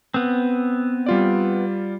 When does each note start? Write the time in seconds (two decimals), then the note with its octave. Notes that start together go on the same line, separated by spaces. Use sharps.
0.14 B3 C4
1.06 G3 F4 D5